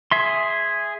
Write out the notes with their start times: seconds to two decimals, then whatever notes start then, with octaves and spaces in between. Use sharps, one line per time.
0.11 G#4 E5 C6